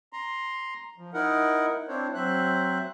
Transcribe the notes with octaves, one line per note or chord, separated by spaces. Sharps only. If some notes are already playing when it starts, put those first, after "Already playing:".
A#5 C6
F3
D#4 E4 A#4 F#5
C4 D4 E4 C5 C#5
F#3 C4 C5 E5 F#6